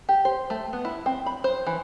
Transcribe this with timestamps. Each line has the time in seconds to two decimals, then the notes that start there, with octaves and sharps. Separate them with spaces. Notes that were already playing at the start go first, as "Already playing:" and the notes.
0.09 G4
0.25 C5
0.50 A3
0.73 B3
0.85 E4
1.06 C4
1.26 B5
1.44 C5
1.67 E3